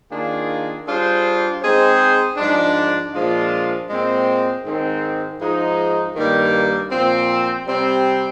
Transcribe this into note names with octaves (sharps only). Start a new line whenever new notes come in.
D#3 A#3 D4 F4 G#4
G3 D4 F4 G#4 C5
G#3 C4 D#4 G#4 C5
G#2 F3 G#3 D4
A#2 F3 G#3 D4 F4
A#2 G#3 C4
G#2 D#3 G#3 C4
G#2 F3 G#3 D#4
G2 D#3 G3 A#3
A#2 F3 C4
C3 G3 C4